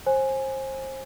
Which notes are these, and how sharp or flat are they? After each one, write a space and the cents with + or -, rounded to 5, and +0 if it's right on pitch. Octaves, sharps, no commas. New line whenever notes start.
C5 +30 G#5 +0